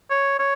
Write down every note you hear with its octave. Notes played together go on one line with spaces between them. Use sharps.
C#5
C#5